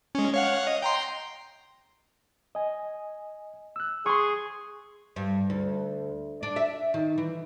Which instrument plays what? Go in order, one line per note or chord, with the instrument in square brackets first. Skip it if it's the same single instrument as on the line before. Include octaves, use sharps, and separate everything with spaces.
[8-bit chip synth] G#3 C#4
C#5 F5 F#5
D#5
G5 A#5 C6
[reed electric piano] D#5 G#5
E6 F#6
[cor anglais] G#4 [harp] C6 C#6
[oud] G2
D2
D4
E5
D#3
E3